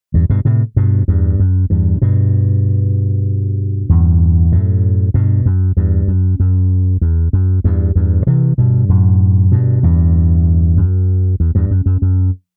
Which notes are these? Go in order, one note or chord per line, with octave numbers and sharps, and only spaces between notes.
E2 G2
G2 B2
A2 C3
G2 B2
E2 G2
F#2
E2 G2
G2 B2
E2 G2
F#2 A2
G2 B2
F#2
E2 G2
F#2
F#2
E2
F#2
E2 G2
E2 G2
C3 E3
G2 B2
F#2 A2
G2 B2
E2 G2
F#2
E2
E2 G2
F#2
F#2
F#2